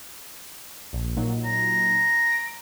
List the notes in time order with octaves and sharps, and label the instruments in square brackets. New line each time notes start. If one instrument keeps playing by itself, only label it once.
[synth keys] A#1
A#2 F#3 D#4
[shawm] A#5
[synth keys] A#6 D7